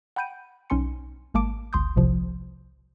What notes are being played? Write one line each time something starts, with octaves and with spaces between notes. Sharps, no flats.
F#5 G5 B5 G6 D7 D#7
B1 C#4 D#4 G#5 C6 C#7
G#1 G#3 A#3 A5 D6 D7
G1 C#2 C6 D#6 G6
G1 C2 A2 C3 F3